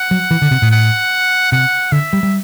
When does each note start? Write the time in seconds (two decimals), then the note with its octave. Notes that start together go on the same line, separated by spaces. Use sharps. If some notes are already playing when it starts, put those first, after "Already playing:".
Already playing: F#5
0.11 F#3
0.31 E3
0.42 D3
0.51 C3
0.62 A2
0.72 F#5
1.52 C3 F#5
1.92 D3 E5
2.13 G3
2.23 G3